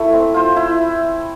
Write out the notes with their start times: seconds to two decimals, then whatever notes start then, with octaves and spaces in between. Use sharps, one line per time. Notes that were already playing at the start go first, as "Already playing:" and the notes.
Already playing: A3 E4
0.13 C4
0.34 F4 C5
0.56 E4